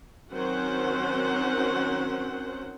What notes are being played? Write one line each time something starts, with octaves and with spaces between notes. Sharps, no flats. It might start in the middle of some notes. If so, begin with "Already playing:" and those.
D#3 F#3 C4 C#4 C5 F#5